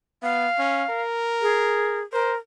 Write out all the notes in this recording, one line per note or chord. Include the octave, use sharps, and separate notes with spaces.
B3 F5
C#4
A#4
G#4
A#4 C5